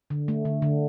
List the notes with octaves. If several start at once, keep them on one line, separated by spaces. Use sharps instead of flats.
D3
A3
D3
D3